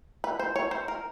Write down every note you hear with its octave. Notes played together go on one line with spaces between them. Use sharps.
B4
C5
C#5
C5
A#4